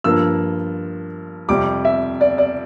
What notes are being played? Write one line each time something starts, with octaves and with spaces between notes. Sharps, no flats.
G2 F3 A#3 E6
F2 C3 G3 D6
E5
D5
D5